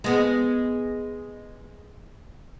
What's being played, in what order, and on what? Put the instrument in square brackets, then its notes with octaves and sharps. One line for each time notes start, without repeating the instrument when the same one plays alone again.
[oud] G#3 B3